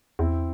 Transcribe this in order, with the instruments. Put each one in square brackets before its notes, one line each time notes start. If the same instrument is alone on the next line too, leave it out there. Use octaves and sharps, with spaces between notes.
[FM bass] E2 [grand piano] C4 E4